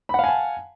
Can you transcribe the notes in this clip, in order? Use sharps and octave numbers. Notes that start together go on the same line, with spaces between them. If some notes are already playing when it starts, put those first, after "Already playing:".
F5 F#5 G#5 A5 B5